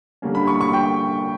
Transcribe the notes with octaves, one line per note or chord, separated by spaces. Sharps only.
D3 G3 A#3 C#4
B5
C#6
C#6
G5